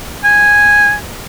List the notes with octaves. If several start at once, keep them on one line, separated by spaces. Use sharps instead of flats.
G#5